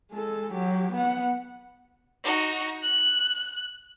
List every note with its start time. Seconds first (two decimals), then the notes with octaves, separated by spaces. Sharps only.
0.12 G#3 A4
0.53 F#3 G4
0.93 B3 F#5
2.24 D#4 F#4
2.83 F#6